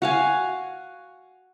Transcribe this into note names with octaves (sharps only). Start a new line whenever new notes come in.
F#4 F5 G#5